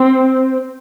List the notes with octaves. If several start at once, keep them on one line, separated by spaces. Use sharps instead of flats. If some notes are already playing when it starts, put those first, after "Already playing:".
Already playing: C4